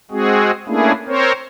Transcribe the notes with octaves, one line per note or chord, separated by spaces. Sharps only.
G#3 C4 F#4 G#4
A3 A#3 C#4 D4 E4 G#4
C4 A#4 C5 C#5